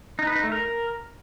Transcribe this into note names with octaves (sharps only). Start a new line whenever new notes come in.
D#4
B4
D#4
A3
A#4